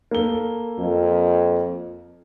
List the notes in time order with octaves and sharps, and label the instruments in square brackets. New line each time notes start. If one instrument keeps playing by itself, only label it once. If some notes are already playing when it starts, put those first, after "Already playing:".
[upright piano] A#3 A4 G7
[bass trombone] F2